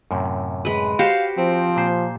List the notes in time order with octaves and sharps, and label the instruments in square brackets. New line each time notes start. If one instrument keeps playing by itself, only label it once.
[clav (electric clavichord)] F#2 A2 C3
[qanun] G#3 B4
[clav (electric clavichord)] F#4 C5 [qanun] G4 [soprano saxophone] F5
[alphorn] F3 [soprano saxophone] C4
[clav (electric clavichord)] A#2 C5